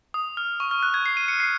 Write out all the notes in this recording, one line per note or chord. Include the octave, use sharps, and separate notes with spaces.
D#6
F6
C#6
F6
F#6
G#6
C7
D#7
C#7
C7